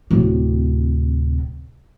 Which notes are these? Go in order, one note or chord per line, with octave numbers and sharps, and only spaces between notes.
D1 C3